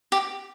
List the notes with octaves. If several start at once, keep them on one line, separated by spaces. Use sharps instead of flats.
G4